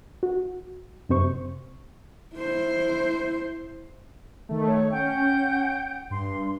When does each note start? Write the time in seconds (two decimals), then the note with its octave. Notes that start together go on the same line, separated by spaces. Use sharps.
0.23 F#4
1.09 F#2 C3 C5 C#6
2.36 E4 C5
4.49 D#3 A3
4.67 C#5
4.93 C#4 F#5 G5 G6
6.10 G2 C6